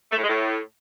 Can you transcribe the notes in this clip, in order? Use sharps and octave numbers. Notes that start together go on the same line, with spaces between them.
A3
A2
G#3
A2